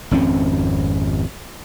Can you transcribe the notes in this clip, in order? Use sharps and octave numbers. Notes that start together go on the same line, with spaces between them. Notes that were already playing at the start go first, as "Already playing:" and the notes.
G#1 F2 C4 C#4